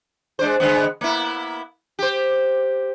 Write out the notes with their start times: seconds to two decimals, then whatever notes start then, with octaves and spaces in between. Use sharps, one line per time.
0.39 G#3 D4 C5
0.60 D3 G#3 B3
1.01 A#3 B3 E4
1.99 G4 C5